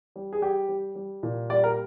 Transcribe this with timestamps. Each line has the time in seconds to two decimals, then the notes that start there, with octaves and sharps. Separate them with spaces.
0.16 G3
0.33 G#4
0.42 G3 G4
0.69 G3
0.95 G3
1.23 A#2
1.50 G3 D5
1.64 A#4